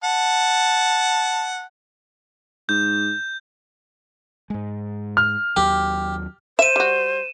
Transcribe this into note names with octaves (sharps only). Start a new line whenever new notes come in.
F#5 A5
G#2 G6
G#2 G#3
F6
D#2 F#3 G4
C5 E5 D#7 E7
G3 F#4